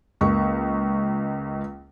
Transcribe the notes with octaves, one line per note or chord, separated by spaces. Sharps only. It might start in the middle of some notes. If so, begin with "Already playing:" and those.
C#2 A#3 C#6